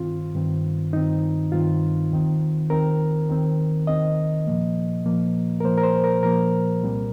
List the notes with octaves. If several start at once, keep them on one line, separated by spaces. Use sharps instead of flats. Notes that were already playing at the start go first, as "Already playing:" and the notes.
Already playing: G2 D#3 C4 F4
G2 D#3 C4
G2 D#3 C4 D#4
G2 D#3 C4 F4
D#2 D#3 C4
D#2 D#3 C4 A#4
D#2 D#3 C4
D#2 D#3 C4 D#5
A#2 F3 A#3
A#2 F3 A#3
A#4
A#2 F3 A#3 C5
A#4
C5
A#4
A#2 F3 A#3 A#4
C2 A#2 G3 C4